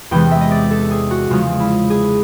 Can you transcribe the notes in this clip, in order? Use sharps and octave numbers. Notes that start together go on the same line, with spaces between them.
E2 C3 E3 G#3 G5
E5
D#5
D5
A4
G#4
F#4
E2 C#3 F3 G#3 F4
E4
G#4